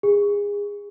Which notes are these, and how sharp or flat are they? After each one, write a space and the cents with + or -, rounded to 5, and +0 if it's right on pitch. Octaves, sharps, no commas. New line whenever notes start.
G#4 -30